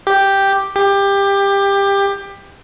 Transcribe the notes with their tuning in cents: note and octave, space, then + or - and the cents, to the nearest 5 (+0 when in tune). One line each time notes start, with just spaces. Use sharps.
G4 +0
G4 +20